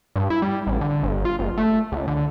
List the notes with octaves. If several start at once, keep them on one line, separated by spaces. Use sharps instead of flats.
G2
E4
G3
A1
D3
G1
F4
F#1
A3
C#2
D3